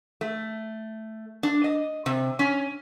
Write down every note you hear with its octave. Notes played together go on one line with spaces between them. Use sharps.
A3
D4
D#5
C3
C#4